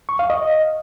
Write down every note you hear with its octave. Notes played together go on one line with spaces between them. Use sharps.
C#6
F5
D#5